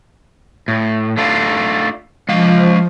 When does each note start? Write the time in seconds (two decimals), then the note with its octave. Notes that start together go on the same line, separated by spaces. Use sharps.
0.68 A2
1.17 A3 D4 F4
2.29 F3 G#3 F5